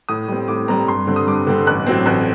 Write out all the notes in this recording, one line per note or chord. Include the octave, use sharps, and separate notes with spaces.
A2 D#6
G3 C4
A2 D6
G3 C4 A#5
G2 C6
D3 G3 C4
D#6
G2 D6
D3 G3 C4
A1 F#6
A2 F#3 C4
A1 F#6